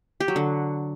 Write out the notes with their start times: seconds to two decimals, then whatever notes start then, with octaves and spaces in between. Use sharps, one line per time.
0.20 G4
0.28 F#3
0.36 D3